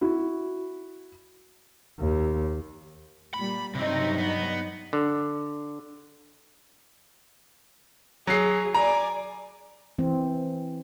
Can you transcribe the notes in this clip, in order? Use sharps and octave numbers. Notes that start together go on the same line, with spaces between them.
E4 F#4
D#2
A#2 G3 B5
G2 C3 F#3 C4 D#4
B3
D3
F#3 G#4 C7
D5 G#5 A#5
E3 C4